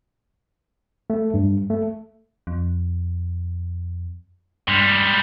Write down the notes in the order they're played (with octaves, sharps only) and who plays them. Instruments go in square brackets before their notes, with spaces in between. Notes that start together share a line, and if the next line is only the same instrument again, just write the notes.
[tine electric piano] A3
G2
A3
[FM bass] F2
[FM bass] G2 [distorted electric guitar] G3 G#3